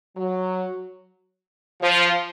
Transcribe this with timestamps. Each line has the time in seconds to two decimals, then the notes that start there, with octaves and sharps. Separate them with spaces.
0.17 F#3
1.82 F3